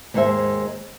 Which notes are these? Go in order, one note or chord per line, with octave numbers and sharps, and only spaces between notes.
D#2 G#2 G#3 C5 E5